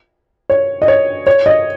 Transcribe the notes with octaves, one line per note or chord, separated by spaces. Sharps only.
C#5
D#5
C#5
C#5
D#5